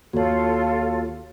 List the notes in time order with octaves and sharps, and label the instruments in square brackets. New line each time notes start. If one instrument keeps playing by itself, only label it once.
[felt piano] D#2 [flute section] F4 A4 [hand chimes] F#4 C#5